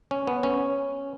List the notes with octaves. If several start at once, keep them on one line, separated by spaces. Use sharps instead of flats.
C#4
B3
C#4